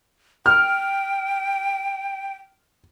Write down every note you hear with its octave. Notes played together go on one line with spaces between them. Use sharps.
G5 F6